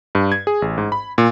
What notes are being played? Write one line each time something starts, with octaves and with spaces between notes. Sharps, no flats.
G2
G#6
G#4
A1
G#2
B5
A#2